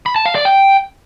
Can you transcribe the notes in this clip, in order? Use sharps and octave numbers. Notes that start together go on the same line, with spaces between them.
B5
A5
F5
D5
G5